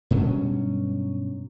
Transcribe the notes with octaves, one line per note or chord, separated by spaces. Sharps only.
G2 B2 F#3 C#4